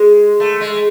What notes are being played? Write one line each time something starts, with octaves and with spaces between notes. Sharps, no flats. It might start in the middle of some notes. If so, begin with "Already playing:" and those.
Already playing: G#3
A3
G#3